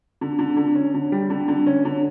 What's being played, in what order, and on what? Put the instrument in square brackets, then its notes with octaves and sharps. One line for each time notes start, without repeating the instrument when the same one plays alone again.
[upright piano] D3
D3
D3
C#4
D3
G3
D3
D3
C#4
D3